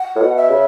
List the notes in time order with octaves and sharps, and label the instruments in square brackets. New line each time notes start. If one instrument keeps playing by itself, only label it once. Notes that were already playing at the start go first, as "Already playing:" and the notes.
Already playing: [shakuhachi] F#5
[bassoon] A2
B2
[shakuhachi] E5
[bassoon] C#3